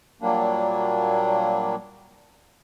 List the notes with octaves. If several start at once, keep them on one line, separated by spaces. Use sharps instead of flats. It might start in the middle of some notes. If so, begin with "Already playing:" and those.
A#2 F#3 G3 A#3 D4